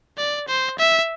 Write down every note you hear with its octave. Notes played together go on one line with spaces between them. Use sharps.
D5
C5
E5